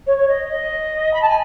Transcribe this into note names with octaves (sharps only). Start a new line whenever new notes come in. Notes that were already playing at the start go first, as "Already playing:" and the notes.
C#5
C#5
D#5
D#5
B5
A5
G#5